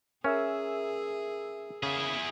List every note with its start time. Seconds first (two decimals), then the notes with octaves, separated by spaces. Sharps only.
0.24 C#4 G#4 A#4 E5 E6
1.83 C#3 E4 G#4